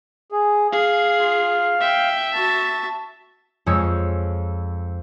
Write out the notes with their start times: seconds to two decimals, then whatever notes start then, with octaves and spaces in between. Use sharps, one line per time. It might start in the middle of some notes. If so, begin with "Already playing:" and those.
0.32 G#4
0.72 G#4 F5
1.18 F4
1.80 E5 G5
2.33 F#4 A5
3.66 F2 F3 G#3 G#4 C#5 E6